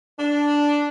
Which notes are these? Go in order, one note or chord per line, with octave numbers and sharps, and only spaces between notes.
D4